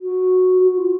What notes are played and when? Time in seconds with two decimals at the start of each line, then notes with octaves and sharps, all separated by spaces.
0.01 F#4
0.62 F#4
0.77 F4